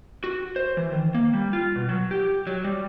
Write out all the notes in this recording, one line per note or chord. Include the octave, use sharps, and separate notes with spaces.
F#4
C5
E3
D#3
A#3
G3
F4
B2
F#3
G4
F#3
G3